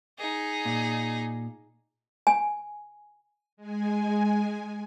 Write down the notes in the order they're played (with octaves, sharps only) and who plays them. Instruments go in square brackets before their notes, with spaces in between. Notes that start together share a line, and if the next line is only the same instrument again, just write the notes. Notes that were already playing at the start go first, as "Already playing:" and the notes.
[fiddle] D#4 G#4
[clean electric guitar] A#2
[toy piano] G#5
[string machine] G#3 G#5